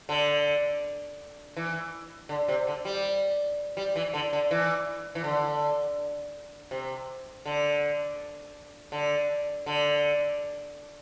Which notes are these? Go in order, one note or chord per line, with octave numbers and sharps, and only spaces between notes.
D3
E3
D3
C3
D3
G3
G3
E3
D3
D3
E3
E3
D3
C3
D3
D3
D3